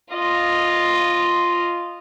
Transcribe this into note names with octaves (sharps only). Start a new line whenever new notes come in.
F4 D#5